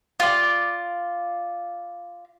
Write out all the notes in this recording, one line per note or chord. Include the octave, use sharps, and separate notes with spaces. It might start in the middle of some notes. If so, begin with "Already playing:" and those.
F4 D5